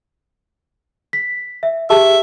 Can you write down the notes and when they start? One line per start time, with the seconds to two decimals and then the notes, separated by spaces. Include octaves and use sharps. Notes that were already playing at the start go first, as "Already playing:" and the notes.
1.13 B6
1.63 E5
1.90 G4 G#4 E5 A5